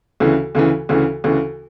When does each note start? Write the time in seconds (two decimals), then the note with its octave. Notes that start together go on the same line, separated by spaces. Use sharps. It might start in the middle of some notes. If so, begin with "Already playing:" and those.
0.20 D2 C#3 E3
0.55 D2 C#3 E3
0.89 D2 C#3 E3
1.24 D2 C#3 E3